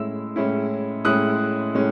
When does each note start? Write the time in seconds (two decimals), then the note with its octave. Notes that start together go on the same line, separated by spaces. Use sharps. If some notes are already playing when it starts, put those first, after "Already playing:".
Already playing: A2 G#3 C#4 E4 E6
0.36 A2 G#3 C#4 E4
1.05 A2 G#3 C#4 E4 D#6 F#6
1.75 A2 G#3 C#4